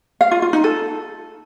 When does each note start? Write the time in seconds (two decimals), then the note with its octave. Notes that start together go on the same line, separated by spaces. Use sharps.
0.21 F5
0.31 F4
0.42 F4
0.53 D#4
0.64 A4